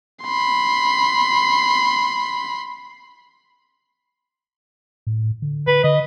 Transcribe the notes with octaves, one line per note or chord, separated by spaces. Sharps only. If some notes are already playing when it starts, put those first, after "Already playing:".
B5 C6
A2
D3
D3 B4
D3 D#5